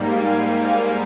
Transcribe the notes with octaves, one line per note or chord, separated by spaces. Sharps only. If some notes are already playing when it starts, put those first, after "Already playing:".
Already playing: G#2 G3 A#3
F5 G#5
F5 G#5